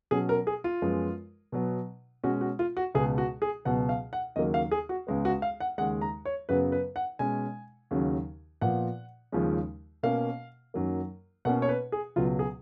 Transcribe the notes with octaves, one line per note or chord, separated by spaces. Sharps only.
B2 F#3 C#4 G#4
A#4
G#4
F4
F#2 F3 G#3 B3
B2 F#3 B3
B2 G#3 C#4 F#4
F#4
F4
F#4
C#2 B2 G#3 B3 G#4
F#4
G#4
C#2 B2 F#3 B3 F#5
F5
F#5
D#2 C#3 F#3 A#3 D#5
F5
G#4
F#4
C#2 C#3 G#3 B3
F#4
F5
F#5
D#2 C#3 G#3 F#5
A#5
C#5
F#2 C#3 F#3 B3 B4
B4
F#5
B2 G#3 C#4 G#5
D#2 C#3 F#3 C#4
A#2 F3 B3 F#5
D#2 C#3 F3 G#3 C#4
B2 A#3 C#4 F5
F#2 D#3 F#3 A#3
B2 A#3 C#4 F#5
C#5
B4
G#4
C#2 B2 F#3 B3 F4
G#4